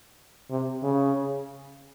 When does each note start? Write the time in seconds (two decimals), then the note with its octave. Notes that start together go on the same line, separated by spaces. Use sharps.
0.50 C3
0.83 C#3